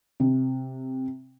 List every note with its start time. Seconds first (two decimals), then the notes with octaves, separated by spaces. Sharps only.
0.20 C3